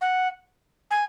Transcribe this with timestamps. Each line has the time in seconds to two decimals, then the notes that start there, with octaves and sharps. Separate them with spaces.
0.01 F#5
0.91 G#5